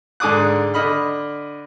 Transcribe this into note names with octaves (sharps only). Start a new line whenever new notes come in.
G#2 D3 G#5 D6 D#6 F#6
D3 D#5 B5 F6